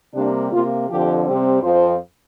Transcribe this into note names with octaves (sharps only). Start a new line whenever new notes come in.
C3 G3 A#3 D4
C3 A#3 F4
F2 D3 F3 G4
C3 G3 C4
F2 F3 C4 C5